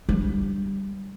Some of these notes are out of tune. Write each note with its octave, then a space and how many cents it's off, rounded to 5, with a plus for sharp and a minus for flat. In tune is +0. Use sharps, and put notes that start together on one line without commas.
G3 +0 D4 +0